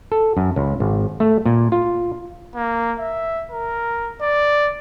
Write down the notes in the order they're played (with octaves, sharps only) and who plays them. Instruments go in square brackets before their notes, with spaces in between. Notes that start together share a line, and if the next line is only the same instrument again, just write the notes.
[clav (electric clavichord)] A4
F#2
C#2
G#1
A3
A#2
F4
[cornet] A#3
E5
A#4
D5